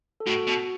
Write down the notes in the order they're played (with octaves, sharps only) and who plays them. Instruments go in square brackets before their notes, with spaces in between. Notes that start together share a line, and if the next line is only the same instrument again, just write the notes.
[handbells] A4
[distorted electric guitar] A2 [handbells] F#4
[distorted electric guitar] B2